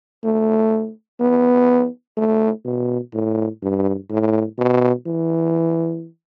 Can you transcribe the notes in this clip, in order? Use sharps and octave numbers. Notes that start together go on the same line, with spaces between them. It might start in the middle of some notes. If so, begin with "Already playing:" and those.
A3
B3
A3
B2
A2
G2
A2
B2
E3